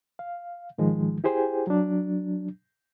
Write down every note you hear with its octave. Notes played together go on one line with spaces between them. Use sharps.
F5
G#2 D#3 F3 G#3
E4 G4 G#4 C5 G5 G#5
F#3 D4